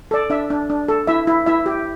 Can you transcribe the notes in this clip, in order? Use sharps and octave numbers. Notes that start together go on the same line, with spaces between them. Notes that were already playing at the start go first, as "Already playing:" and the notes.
A4 D5
D4 E5
D4
D4
A4
E4 E5
E4
E4 E5
G4